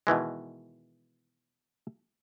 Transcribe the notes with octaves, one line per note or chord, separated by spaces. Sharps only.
B2 D#3 E3 G#3